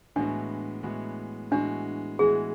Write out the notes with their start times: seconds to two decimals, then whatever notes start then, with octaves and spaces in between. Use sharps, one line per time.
0.16 A2 E3 G#3 B3 D4 F#4
0.83 A2 E3 G#3 B3 F#4
1.51 A2 E3 G#3 B3 D4 F#4
2.19 A2 E3 G#3 B3 F#4 G#4